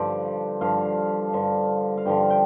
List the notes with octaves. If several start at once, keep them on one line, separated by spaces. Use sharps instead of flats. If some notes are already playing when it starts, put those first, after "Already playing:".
Already playing: G2 D3 F3 D5
G2 D3 F3 F5
G2 D3 F3
F5
G2 D3 F3 G5
G5